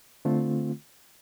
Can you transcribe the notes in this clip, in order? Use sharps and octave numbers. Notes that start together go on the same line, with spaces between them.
D3 A3 C4 F4